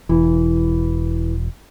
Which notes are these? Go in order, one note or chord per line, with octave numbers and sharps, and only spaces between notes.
E1 E3